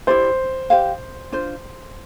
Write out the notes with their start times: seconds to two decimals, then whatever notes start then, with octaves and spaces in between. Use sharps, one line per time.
0.07 E4 G4 C5 D5
0.70 G4 C5 F5
1.32 D4 F4 C5